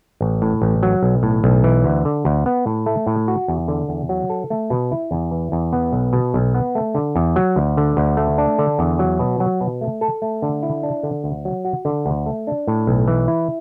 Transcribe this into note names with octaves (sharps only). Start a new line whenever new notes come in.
A1
A2
A1
F#3
B1
A2
B1
E3
D2
D3
D2
B3
A2
A3
A2
F#4
E2
D3
E2
F#3
A4
A3
B2
E4
E2
E3
E2
B3
B1
B2
B1
B3
A3
D3
E2
F#3
D2
D3
D2
A3
D4
D3
E2
F#3
B2
F#3
B2
A3
A4
A3
D3
E4
D4
D3
D2
F#3
F#4
D3
D2
A3
D4
A2
B1
E3
E4